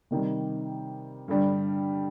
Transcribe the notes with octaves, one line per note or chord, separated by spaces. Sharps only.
C3 D#3 G3
G2 D3 G3 D4